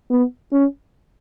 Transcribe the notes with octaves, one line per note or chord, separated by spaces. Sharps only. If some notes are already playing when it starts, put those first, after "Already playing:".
B3
C#4